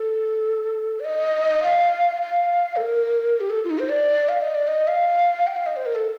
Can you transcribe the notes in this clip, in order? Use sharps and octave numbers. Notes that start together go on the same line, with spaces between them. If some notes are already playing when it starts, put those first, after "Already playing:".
Already playing: A4
D5
D#5
F5
F5
A4
A#4
G4
A4
F4
D#4
C5
D5
F5
D#5
D5
D#5
F5
G5
F5
D#5
C5
A#4
A4